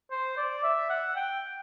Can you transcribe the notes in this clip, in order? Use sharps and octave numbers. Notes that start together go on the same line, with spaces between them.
C5
D5
E5
F#5
G5